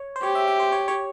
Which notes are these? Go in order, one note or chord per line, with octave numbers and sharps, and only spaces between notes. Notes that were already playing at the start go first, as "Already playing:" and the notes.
Already playing: C#5
C5
G4 C#5
E5
E5
C5
C#5
C#5